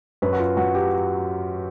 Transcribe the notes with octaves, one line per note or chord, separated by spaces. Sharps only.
F#2 B4
F#4
F4
F#3 F#4
G4